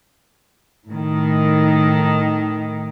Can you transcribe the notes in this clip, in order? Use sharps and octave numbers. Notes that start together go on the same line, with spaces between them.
A2 D#3